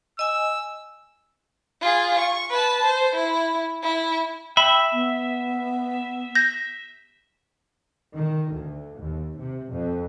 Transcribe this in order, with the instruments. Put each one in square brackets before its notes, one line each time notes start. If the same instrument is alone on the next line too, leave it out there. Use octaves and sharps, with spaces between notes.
[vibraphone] D#5 G#5 [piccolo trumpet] E6
[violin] F4 G#4
C#6
B4 A5
C5
E4
E4
[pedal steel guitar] E5 [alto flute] G5 [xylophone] B5
[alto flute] B3
[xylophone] G6 A#6
[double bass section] D#3
D2
D#2
C3
F2